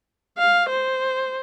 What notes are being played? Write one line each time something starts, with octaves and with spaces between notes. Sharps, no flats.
F5
C5